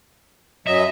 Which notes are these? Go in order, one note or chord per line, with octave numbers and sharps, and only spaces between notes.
F#2 F#3 D#5 E5